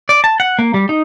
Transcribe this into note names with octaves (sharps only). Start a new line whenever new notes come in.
D5
A5
F#5
A#3
G3
D#4